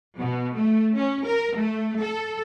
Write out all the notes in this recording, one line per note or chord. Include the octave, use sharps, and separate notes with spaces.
B2
A3
C#4
A#4
A3
A4